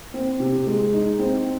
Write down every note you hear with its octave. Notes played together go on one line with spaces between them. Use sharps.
C4
C3
G#3
D#4
C4